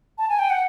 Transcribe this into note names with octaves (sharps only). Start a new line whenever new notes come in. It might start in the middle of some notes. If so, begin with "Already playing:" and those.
A5
G#5
G5
F#5